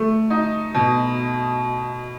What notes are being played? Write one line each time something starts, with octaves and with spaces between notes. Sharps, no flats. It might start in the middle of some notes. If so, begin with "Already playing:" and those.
Already playing: A3
D#4
B2